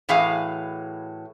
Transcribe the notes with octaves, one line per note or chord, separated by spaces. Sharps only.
A2 E3 F#3 G#4 F5